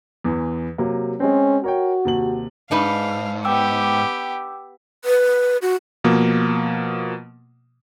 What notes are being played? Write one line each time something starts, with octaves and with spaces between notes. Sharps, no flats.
E2 E3
C3 F#3 A#3
G#3 C4 C#4
F#4 A#4 C#5 G5
D#2 C3 F#7
G#2 D4 D#4 B4 F5
B3 G4 G5 D6 E6
B4
F#4
B2 F3 A#3